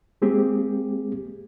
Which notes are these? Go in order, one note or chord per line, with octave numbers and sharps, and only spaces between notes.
G#3 A#3 C4 G4 G#4